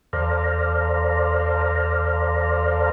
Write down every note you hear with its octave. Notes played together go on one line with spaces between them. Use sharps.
E2 A4 C5 D5 F5 A#5